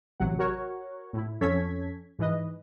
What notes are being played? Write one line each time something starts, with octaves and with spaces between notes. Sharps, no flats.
A1 C3 F#3 F#5
F#4 A#4 C#5 F#5 C#6
A2 E4
F2 C#4 A4 C#5 G#6 B6
G#2 E3 B4 D#5